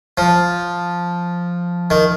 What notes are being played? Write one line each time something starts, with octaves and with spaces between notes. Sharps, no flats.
F3
D#3